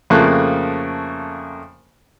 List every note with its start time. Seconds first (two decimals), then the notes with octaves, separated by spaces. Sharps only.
0.10 F2 C#3 A3 A#3 F#6